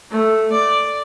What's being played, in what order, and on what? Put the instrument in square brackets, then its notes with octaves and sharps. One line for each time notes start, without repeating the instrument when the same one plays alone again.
[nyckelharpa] A3
D5